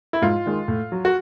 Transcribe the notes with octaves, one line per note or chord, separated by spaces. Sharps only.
E4
G#2 F4
D#3 G#3
A2
F#3
F#4